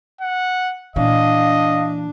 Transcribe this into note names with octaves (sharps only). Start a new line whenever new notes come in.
F#5
A#2 E3 D4 D#5 F5